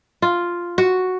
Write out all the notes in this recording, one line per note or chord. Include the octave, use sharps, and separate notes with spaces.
F4
F#4